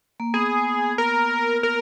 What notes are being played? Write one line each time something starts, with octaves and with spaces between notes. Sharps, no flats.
A#3
B3 G#4
A#4
A#4